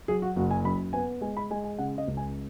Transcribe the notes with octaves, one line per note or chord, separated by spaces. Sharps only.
F#3 G#4
F#4
F#1 F#4
G#5
F#2 B5
B3 G#5
G#3 G#5
B5
G#3 G#5
G#5
C#3 F#5
D#5
C#2
G#5